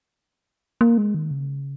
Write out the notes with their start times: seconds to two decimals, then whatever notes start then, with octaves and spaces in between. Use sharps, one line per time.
0.81 A#3
0.98 G#3
1.15 D#3
1.31 C#3